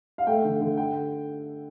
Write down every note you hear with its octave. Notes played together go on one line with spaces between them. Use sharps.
F5
A3 G5
D3
D3
G5